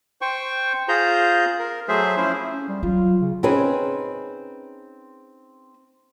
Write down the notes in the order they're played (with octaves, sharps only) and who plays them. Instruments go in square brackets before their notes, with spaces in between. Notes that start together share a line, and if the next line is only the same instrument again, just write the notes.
[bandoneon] C5 G5 C#6
F4 G#4 C5 A#5 G6
A#4
F#3 A3 G#4 C5 E5
F3 C#4 E4 C5
[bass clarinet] C#4
G3
[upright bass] F#3 [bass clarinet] F4
[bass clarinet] C#3
[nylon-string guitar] C4 C#4 D#4 G#4 B4